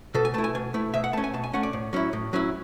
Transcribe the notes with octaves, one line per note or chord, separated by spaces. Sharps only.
B2 A4
G#5
A3 E4 A5
G#5
B2 G#5
A3 E4
B2 E5
F#5
A3 C#4 A5
G#5
B2 A5
G#5
A3 C#4 F#5
D5
A2
F#3 C#4 E4
A2
F#3 C#4 E4